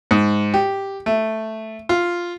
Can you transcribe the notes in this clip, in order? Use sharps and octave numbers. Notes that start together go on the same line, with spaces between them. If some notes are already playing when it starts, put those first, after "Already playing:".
G#2
G4
A3
F4